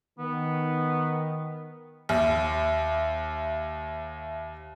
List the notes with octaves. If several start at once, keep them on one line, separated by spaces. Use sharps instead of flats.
D#3 B3
D#2 E5